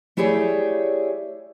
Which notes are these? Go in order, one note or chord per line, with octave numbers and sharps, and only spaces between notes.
A3 E4 G4 G#4 C#5 D5